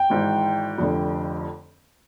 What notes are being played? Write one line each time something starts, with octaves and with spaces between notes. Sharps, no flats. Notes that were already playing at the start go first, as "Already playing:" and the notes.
Already playing: G5
G#1 G#2 E3
F1 F2 D3